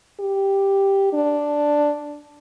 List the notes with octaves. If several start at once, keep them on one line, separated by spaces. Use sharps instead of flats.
G4
D4